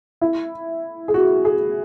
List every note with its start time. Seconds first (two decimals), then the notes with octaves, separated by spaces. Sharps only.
0.21 E4
1.08 G#4
1.14 F#4
1.45 G#4